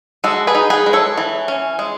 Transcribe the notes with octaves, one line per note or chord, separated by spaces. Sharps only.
G#3 F#4 A4
G#4 B4
D#4
G#4 B4
G#3
A4 C#5
E3
C#4
G#3